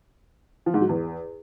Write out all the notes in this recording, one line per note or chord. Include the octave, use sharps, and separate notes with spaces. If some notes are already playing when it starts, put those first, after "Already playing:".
F3
G#2
F#3
E2